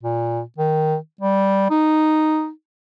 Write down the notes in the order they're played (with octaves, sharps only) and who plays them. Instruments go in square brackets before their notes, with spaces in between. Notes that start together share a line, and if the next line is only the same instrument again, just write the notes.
[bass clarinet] A#2
D#3
G3
D#4